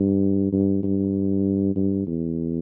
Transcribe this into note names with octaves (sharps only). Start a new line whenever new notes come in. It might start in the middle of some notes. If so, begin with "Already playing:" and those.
Already playing: G2
G2
G2
G2
E2